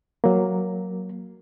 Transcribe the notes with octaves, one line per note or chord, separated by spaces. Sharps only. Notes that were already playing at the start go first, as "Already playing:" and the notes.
F#3 A#3